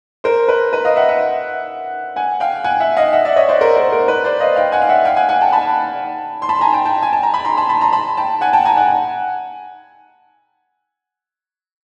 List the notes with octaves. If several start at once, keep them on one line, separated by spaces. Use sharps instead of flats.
A#4 C5
B4
B4
D#5 F5
E5 F#5
E5 F#5
F#5 G#5
F5 G5
F#5 G#5
E5 F#5
D#5 F5
E5 F#5
D5 E5
C#5 D#5
C5 D5
A#4 C5
A#4 C5
A#4
B4
C5 D5
D#5 F5
F5 G5
F#5 G#5
F5
E5 F#5
F5 G5
F#5 G#5
F#5 G#5
G5 A5
A5 B5
C6
A5 B5
G#5 A#5
G5 A5
G5 A5
G#5
A5
A#5
B5
A#5 C6
A5 B5
A5 B5
A#5 C6
A5 B5
G5 A5
F#5 G#5
G5 A5
G#5 A#5
F#5 G#5